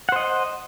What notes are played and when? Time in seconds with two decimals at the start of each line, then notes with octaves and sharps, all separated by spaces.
0.09 F#5
0.12 C5
0.16 D#5